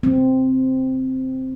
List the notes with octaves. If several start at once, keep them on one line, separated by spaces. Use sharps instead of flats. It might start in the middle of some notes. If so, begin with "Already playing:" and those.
C4